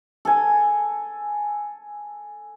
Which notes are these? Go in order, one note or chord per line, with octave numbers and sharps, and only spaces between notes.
A4 G#5